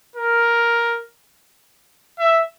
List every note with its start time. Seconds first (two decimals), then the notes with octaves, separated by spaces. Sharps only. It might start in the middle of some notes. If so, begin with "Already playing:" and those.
0.16 A#4
2.19 E5